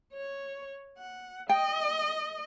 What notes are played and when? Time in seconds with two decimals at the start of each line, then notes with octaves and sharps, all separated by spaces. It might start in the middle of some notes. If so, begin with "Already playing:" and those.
0.13 C#5
0.97 F#5
1.49 D#5 G5